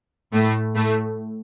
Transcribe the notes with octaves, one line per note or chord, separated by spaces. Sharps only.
A2 A3
A2 A3